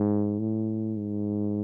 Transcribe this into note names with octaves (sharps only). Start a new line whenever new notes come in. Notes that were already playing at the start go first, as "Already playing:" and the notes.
Already playing: G#2
A2
G#2